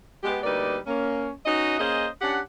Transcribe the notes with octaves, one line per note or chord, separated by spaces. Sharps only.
G#3 B3 G4
D2 G3 A#3 D#4 B4 D5
A#3 C#4
C#4 D#4 F#4 B4 D#5
A#3 C#4 G#4 C5 D#5
C#4 D4 G4 F#5